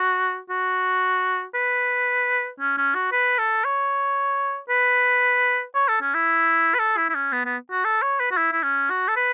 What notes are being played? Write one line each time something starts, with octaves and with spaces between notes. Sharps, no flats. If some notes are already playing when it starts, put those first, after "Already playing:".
Already playing: F#4
F#4
B4
C#4
C#4
F#4
B4
A4
C#5
B4
C#5
A4
C#4
E4
B4
A4
E4
E4
C#4
B3
B3
F#4
A4
C#5
B4
F#4
E4
E4
C#4
F#4
A4
B4